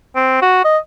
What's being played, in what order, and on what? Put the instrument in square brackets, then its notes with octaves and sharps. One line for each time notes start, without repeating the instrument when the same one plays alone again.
[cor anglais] C4
F#4
D#5